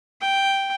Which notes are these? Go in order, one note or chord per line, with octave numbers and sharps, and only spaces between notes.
G5